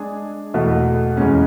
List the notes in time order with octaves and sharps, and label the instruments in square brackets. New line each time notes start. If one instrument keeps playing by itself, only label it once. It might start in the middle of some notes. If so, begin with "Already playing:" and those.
Already playing: [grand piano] G#3 D4 G#4
E2 B2 A3
E2 C#3 G#3 C#4